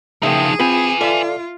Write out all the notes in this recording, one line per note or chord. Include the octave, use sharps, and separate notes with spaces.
C#3 F3 A#3 D#4 G#4 E5 G5
C4 F4 B4 G#5 B5
F4 A4 D5 E5 F5